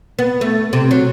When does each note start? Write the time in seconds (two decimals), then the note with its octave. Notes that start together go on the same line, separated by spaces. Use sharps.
0.19 B3
0.41 A3
0.73 C3
0.91 F#3